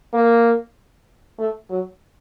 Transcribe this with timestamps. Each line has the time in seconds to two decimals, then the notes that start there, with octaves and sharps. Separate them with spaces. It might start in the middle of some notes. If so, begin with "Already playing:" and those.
0.14 A#3
1.39 A3
1.70 F#3